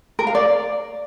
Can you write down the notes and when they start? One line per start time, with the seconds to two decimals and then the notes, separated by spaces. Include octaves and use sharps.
0.19 A#4
0.27 F5
0.35 D5